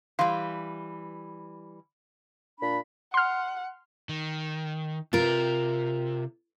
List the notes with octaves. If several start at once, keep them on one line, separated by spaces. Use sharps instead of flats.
E3 G3 F5 C6
A#2 D4 B5
F#5 C6 F6
D#3
C3 F4 A#4